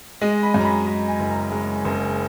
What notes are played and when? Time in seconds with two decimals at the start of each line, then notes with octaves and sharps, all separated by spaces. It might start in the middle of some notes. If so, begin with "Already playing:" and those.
0.21 G#3 D#5
0.43 B5
0.54 F#2
0.60 A#5
0.65 B5
0.87 G#3 A#5
1.08 G#5
1.19 F#1
1.31 A#5
1.52 G#3
1.85 F#1